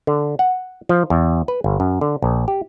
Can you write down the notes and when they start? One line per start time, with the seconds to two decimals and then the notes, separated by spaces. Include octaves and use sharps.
0.07 D3
0.39 F#5
0.89 F3
1.10 E2
1.48 B4
1.64 G1
1.80 F#2
2.01 D3
2.22 A#1
2.48 G4